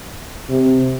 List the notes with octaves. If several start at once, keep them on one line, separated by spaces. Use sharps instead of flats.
C3